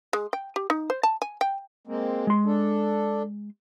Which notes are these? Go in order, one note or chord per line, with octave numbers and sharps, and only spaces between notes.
G#3
G5
G4
D#4
C5
A5
G#5
G5
G#3 A#3 C4
G#3 C6
D4 A4